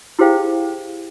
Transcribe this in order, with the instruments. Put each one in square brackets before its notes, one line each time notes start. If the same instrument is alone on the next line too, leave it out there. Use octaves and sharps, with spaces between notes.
[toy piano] E4 G4 G#4 C5 F5 G5